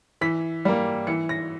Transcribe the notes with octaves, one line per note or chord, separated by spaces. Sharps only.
E3 B6
G3 A#3
E3 C#7
A#6